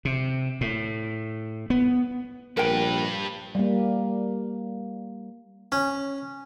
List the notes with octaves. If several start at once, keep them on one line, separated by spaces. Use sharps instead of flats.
C3
A2
B3
A#1 G2 A#4 B4 G5
G3 A#3
C#4